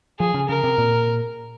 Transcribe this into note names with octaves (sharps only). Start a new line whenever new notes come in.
F3 G#4
C#3
C#3 A#4
C3
A#2